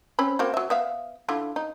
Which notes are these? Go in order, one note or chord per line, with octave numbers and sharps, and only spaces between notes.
C4 C#4 B5
A#3 C4 F#4
F#3 E5
B3 E5 F5
D3 E4 F4
D#4